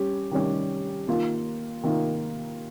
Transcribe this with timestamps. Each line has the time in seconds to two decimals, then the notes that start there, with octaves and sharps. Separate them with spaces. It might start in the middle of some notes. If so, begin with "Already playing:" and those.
Already playing: G3 C#4 G4
0.31 D#3 G3 C#4 G4
1.08 D#3 A#3 F4
1.83 D#3 A#3 F4